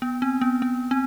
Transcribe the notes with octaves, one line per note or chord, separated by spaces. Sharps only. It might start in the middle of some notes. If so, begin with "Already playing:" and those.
B3
C4
B3
B3
C4